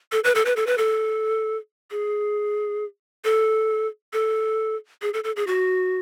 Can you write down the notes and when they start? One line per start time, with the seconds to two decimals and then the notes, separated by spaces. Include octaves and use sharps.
0.12 A4
0.24 B4
0.35 A4
0.45 B4
0.56 A4
0.67 B4
0.78 A4
1.91 G#4
3.25 A4
4.13 A4
5.02 G#4
5.14 A4
5.24 A4
5.36 G#4
5.47 F#4